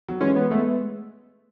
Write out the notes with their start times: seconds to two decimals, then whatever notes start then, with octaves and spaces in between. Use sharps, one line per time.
0.08 F#3
0.20 E3 G#3 C#4
0.36 B3
0.50 G#3 A3 B3